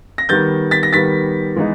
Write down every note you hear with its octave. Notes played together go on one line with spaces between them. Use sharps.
A#6
D#3 G3 B3 G6 A6
A6 B6
A#6
D#3 G3 B3 A6 B6
E3 G#3 B3 D#4